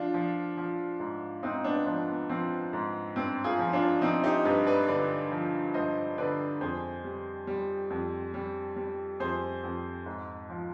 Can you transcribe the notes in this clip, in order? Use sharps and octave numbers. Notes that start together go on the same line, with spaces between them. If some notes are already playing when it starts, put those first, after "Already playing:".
Already playing: F3 D4 F4
F3
F3
G#2
G#2 C4 D#4
B3 D4
F3 B3 D4
B3
F3 C4
G#2
G2 C4
F4 G#4
F3
D4 F4
F3 C4 D#4
D#4 G4
G2 G4 B4
B4 D5
D3 B4 D5
F3
G2 C5 D#5
D3 B4 D5
F2 G#4 C5
G3
G3
F2
G3
G3
F2 G#4 C5
F2
G#2
F3